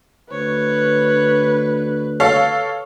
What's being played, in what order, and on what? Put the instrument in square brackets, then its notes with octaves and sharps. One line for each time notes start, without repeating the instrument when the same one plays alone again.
[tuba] D2 [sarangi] B4 [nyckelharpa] C#5
[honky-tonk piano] A4 C#5 F5